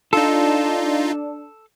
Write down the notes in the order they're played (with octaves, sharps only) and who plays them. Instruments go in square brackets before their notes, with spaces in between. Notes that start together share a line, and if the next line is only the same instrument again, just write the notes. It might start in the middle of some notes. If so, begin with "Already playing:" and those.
[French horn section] D4 [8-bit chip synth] D#4 F4 [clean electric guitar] A4